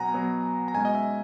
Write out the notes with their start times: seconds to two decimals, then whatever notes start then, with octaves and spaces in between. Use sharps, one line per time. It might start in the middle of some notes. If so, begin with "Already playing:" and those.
Already playing: B2 F#3 B3 F#5 G#5 A#5
0.14 B2 F#3 B3
0.68 A#5
0.74 B2 G#3 C#4 G#5
0.85 D#5
0.95 E5